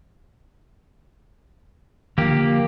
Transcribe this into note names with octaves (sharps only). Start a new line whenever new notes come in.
D3 F3 A#3 G4